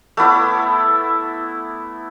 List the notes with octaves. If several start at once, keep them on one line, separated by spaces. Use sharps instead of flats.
A3 B3 E4 D6